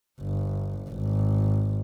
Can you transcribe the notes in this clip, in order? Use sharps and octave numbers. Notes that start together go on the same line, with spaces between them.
G1
G#1